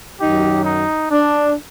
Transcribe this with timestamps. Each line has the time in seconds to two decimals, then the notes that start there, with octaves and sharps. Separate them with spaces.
0.20 F#2 D#3 F#3 D#4 G4
0.65 D#4
1.11 D4